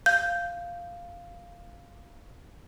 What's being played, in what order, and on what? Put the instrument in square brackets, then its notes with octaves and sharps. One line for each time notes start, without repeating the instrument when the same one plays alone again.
[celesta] F5 [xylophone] G6